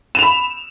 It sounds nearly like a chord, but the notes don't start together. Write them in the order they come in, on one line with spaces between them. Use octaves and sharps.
E7 F7 B5